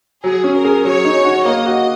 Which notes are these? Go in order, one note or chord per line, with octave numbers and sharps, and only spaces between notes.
F#3 G#4
C#4
A#4
G#4
F#3 C#5
D#4
F#4
A#3 D#5
F#4